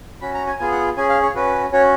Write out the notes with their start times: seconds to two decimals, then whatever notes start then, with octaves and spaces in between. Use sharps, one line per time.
0.21 C#4 F#4 B5
0.34 A#5
0.47 G#5
0.59 B3 F4 G#4 G#5
0.72 F#5
0.97 C#4 G#4 G#5
1.09 F5
1.23 C#5
1.35 C#4 F#4 B4
1.72 C#4 F#4 C#5